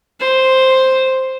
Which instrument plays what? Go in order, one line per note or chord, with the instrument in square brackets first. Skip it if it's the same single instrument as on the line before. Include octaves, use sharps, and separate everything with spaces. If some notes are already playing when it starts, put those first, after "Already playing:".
[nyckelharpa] C5